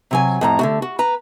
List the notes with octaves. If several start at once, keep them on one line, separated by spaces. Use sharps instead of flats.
C3 F#3 G#5
F2 A2 A#5
D3 A3 F#4
F#4
B4 A#5